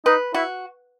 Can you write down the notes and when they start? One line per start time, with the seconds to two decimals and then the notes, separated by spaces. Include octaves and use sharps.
0.05 D#4 B4
0.34 E4 F#4